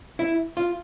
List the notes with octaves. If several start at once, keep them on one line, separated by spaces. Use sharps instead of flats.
E4
F4